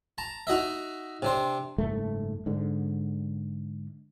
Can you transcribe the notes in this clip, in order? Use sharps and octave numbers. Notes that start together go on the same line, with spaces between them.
A5 A#5
D#4 F#4 D#5 E5
C3 D4 C5
F#1 G#2 A3
G#2 D3